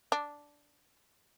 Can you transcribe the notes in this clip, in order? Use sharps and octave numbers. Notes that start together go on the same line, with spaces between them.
D4